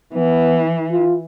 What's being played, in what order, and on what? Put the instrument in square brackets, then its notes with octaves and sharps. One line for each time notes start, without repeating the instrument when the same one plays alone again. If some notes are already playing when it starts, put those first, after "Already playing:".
[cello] E3 [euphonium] B3
[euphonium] F4